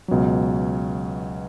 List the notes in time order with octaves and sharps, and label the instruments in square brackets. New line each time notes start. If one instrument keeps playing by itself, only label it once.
[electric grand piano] C#2 B2 F#3